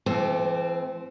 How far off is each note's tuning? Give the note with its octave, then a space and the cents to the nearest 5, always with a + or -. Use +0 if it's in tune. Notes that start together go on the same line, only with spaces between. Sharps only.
E3 +40 A3 -35 C4 +0